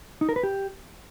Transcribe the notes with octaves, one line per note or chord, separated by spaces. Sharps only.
D#4
A#4
B4
G4